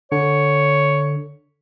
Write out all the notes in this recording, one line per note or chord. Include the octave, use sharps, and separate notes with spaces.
D3 C#5